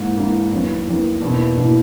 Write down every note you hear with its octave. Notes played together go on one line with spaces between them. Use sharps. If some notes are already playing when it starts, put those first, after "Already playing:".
Already playing: G#2 E3 A#3 D#4
G#2 E3 A#3 D#4
E2 D#3 F#3 A#3
E2 D#3 F#3 A#3
E2 B2 A#3 E4
E2 B2 A#3 E4